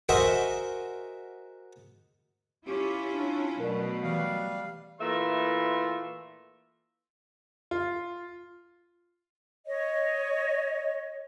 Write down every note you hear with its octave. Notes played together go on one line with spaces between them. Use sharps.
F#4 G#4 A#4 C5 D#5 E5
C#4 E4 F4 G4
D4
B2 F#3 A3 A#4 B4 D5
E3 G3 F5
A#2 E3 A3 E5 C6
F4
C#5 D#5